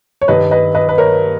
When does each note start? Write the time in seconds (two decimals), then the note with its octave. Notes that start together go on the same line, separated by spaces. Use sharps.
0.22 C#5
0.28 G2 D#3 G3 B4 D#5
0.51 B4 D#5
0.75 B4 D#5
0.89 B4
0.98 A#4 C#5